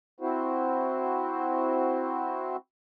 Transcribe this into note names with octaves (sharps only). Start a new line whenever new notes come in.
C4 E4 F#4 C5